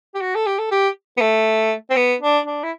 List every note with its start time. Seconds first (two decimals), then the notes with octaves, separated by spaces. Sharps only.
0.15 G4
0.21 F#4
0.35 A4
0.46 G4
0.59 A4
0.71 G4
1.17 B3
1.21 A3
1.90 C4
1.96 B3
2.21 D4
2.46 D4
2.63 E4